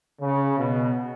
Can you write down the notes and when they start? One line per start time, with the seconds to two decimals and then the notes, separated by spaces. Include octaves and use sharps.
0.21 C#3
0.58 B2